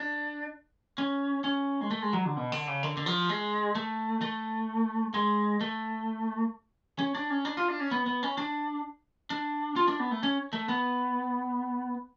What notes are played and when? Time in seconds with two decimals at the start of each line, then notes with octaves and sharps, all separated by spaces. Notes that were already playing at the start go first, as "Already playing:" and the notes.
Already playing: D4
0.98 C#4
1.44 C#4
1.81 G#3
1.91 A3
2.02 G#3
2.13 F#3
2.25 D3
2.37 B2
2.52 D3
2.67 C#3
2.83 D3
2.97 D3
3.06 F3
3.29 G#3
3.75 A3
4.21 A3
5.14 G#3
5.61 A3
6.99 C#4
7.15 D4
7.30 C#4
7.45 D4
7.57 F4
7.68 D4
7.80 C#4
7.91 B3
8.06 B3
8.23 C#4
8.38 D4
9.30 D4
9.76 F4
9.88 D4
10.00 B3
10.11 A3
10.23 C#4
10.53 A3
10.69 B3